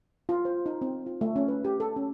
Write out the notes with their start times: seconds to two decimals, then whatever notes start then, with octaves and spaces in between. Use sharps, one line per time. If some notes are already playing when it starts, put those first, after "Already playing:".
0.29 F4
0.45 C5
0.66 D#4
0.81 C4
1.06 F4
1.21 A3
1.36 C#4
1.48 B4
1.65 G4
1.80 A4
1.96 C#4